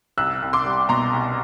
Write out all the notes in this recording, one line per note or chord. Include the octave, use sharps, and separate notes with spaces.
C2 E6 F#6
C2
C6 D6
G3
B2 A#5 C6
C2